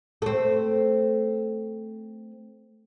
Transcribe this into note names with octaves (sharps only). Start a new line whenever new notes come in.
A3 C4